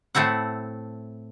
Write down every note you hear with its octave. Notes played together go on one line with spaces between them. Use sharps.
A2 A3 C4 E4 F#5